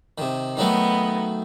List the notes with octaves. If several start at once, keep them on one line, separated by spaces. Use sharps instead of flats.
C3 D#3
D#3 F#3 A3 B3 D#4